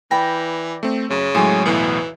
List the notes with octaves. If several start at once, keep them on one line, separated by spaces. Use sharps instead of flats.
E3 D5 G5 B5 A#6
A3 C4
F#2 C#3
A2 F#3 G#3 C5 G#5 D6
B1 E2 A2 E3